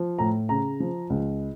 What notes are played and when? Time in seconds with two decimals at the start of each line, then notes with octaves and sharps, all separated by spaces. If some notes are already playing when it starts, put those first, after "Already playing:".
Already playing: F3
0.19 A2 A#5
0.49 C#3 A#5
0.80 F3
1.10 C#2